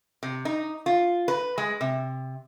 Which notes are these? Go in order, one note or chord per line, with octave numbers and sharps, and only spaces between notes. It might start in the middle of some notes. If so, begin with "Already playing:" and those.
C3
D#4
F4
B4
G#3
C3